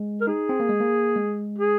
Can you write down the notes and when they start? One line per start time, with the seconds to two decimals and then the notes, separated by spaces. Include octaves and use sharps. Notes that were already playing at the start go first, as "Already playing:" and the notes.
Already playing: G#3
0.21 A#4
0.27 D#4 G#4
0.49 C4
0.60 A#3
0.69 G#3
0.80 A#3
1.16 G#3
1.58 G#4